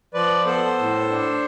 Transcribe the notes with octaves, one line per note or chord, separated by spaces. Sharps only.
F3 B4 D5
B3 A4 C5
A2
D4